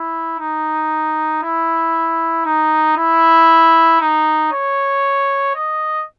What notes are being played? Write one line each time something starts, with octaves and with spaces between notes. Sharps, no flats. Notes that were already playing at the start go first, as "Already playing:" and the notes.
Already playing: E4
D#4
E4
D#4
E4
D#4
C#5
D#5